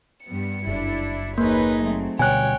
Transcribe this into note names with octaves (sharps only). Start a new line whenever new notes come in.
G2 G3 B3 C#7
F#1 D4 E4
D#2 A#3 D#4 G#4 B4 C#5
F#3 A3 C4
D2 B2 D3 G3 C#5 G5 G#5 F#6